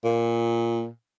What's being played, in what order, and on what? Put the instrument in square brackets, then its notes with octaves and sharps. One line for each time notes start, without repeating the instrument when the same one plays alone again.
[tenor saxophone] A#2